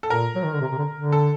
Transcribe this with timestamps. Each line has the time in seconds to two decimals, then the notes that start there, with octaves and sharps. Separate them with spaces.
0.03 A4
0.10 A#2 A#4
0.35 F#3
0.44 D#3
0.53 D3
0.61 C3
0.72 C3
0.78 D3
0.95 D3
1.12 A4